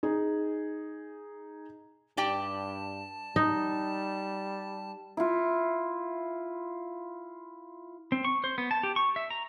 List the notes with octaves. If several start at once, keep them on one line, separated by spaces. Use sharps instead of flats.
D#4 G#4
G2 G4 D5 G5 A5
G3 D#4
E4 F4
C4
C#6
C5
B3
A5
G4
C#6
E5
A#5